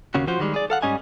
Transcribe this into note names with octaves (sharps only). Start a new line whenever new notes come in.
D#2 C#3 C#4 F#4
F3 F4 F#4 C5
D#3 G3 G#3
G#4 D5
A4 F5 F#5
G#2 G3 C#4 D#5 G#5